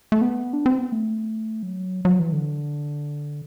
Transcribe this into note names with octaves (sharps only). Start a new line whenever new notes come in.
A3
B3
D4
C4
B3
A3
F#3
F#3
E3
D3